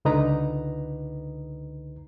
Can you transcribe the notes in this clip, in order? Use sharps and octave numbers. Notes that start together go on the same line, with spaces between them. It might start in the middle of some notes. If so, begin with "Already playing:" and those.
C#2 D3 D#4 B4 A#5